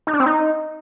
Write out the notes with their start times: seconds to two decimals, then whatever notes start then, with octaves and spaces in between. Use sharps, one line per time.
0.07 D#4
0.13 D4
0.20 C4
0.26 D#4